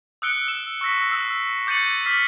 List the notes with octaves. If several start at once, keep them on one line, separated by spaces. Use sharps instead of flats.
D#6 E6 F#6 C#7 D7 G7
E6 E7
C#6 E6 A#6 B6
D#6 E6 C7
D6 G6 A6 C#7 D#7 F#7
D6 F6 A6 B6 C7 F#7